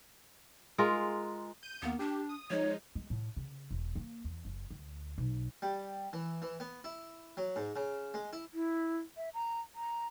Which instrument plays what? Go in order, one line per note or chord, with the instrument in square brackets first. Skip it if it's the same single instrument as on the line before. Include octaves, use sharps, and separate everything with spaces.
[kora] G#3 F4 A#4
[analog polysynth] G6 D#7
[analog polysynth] D#2 A#3 [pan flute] B3
[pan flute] D4 [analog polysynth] G4
[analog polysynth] D#6
[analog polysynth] F3 G#3 D#4 [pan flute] C#5
[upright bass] G#3
A2
C#3
E1
A#3
E2
F#1
D2
B1
[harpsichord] G3
E3
E3
B3
E4
F#3
G#2
C#3
G#3
E4
[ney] E4
E5
A#5
A#5